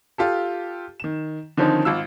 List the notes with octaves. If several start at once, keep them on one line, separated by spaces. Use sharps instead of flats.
F4 G4 A4
D#3 E7
D3 D#3 F3 C4 C#4 D#4
G#1 F4 E6